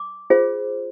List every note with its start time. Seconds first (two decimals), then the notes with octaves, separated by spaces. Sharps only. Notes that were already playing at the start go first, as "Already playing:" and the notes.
Already playing: D6
0.30 F4 G#4 C5